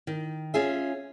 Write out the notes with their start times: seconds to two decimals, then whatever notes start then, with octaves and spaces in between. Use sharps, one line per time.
0.07 D#3
0.54 C#4 F4 G#4 E5